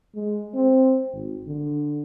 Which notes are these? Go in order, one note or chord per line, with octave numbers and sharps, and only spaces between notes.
G#3
C4
G#1
D3